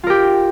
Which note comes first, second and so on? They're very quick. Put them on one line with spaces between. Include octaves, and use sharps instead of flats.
F4 A#4 G4